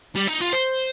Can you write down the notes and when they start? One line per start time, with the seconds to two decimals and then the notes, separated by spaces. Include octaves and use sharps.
0.16 G3
0.28 D#4
0.41 F4
0.53 C5